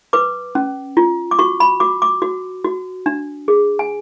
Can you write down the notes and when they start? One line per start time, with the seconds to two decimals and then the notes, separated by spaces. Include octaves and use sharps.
0.13 B4 D6
0.55 C#4
0.97 F4
1.31 D6
1.39 F#4 C#6
1.60 B5
1.80 F#4 D6
2.02 D6
2.22 F#4
2.64 F#4
3.06 D4
3.48 G#4
3.79 G#5